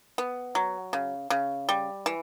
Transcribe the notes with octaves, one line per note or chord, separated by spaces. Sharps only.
B3
F#3
C#3
C#3
G3
E3